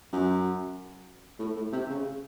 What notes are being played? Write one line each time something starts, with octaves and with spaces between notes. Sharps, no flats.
F#2
A2
A2
C3
C#3